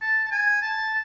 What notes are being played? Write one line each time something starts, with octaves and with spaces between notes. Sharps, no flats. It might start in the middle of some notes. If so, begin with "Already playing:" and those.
A5
A5
G#5
A5